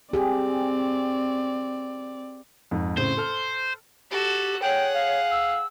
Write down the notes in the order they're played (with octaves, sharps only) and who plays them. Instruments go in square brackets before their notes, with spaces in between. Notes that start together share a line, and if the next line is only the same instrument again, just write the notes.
[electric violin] C4 D5 [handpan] G4 G#4
[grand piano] F2 G#2
[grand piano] A2 C#3 C4 [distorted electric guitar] C5
[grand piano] A4 F6
[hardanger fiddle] F#4 A4 [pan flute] G4
[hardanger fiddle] G#4 F#5 [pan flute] C#5 [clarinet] G5
[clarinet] F5
[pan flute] E6